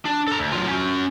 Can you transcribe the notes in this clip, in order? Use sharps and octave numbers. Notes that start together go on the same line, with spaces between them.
D4
A4 A#5
D2
F#3 F4
C#4 F#4